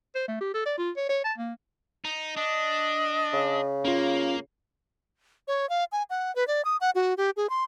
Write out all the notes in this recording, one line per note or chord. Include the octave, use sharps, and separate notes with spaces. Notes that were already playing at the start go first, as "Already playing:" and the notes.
C5
A3
G4
A4
D5
F4
C#5
C#5
A5
A#3
D#4
D4 D#5
C#3
A#3 C#4 F4
C#5
F5
G#5
F#5
B4
D5
D#6
F#5
F#4
G4
G#4
C6